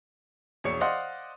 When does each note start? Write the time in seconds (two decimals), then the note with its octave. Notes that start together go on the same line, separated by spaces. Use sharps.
0.64 E1 A#1 C#5 C#7
0.80 C5 D5 D#5 F5 F#5 C6